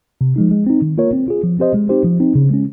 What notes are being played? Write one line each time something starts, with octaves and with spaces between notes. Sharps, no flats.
C3
F3 G#3 D#4
G#3
C4 D#4
D#3
A#3 F4 A#4 C#5
C4
F4 G#4
F3
C4 G4 C5 D#5
G#3
C4 D#4 G4 C5
F3
C4 D#4
C#3
G#3 C#4